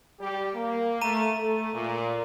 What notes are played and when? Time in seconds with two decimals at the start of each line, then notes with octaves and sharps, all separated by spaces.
0.19 G3 G4
0.54 A#3
1.01 A3 A#5 D#7
1.34 A3
1.74 A#2